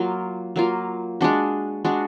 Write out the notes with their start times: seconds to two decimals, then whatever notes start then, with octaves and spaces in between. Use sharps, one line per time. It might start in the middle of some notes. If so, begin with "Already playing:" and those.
Already playing: F#3 A#3 F4
0.56 F#3 A#3 F4
1.21 G#3 D4 F#4
1.85 G#3 D4 F#4